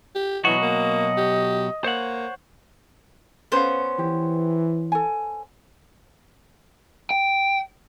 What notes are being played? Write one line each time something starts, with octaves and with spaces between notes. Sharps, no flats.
G4
B2 E3 F#3 F#4 D#5
A#3
G4
A#3 C5 C#5 F#5
B3 C#4 B4 C5 F5
E3 G4
A4 G#5
G5